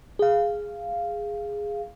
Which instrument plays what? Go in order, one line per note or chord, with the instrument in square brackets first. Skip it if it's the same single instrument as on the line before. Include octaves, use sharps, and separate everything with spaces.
[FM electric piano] G#4 F5